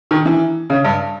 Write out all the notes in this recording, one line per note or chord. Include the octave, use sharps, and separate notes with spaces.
D#3
E3
C#3
G2